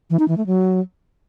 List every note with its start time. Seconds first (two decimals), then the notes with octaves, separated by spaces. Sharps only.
0.10 E3
0.19 D#4
0.28 E3
0.37 A3
0.46 F#3